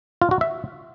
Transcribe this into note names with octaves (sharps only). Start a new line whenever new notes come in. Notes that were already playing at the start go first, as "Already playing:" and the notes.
F4
F#4
E5